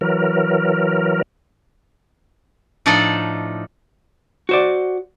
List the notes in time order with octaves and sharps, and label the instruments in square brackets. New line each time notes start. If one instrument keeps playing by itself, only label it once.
[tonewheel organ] E3 F#3 A#4
[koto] A2 F3 D4 D#4 A4 D5
[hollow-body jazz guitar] F#4 C5 D5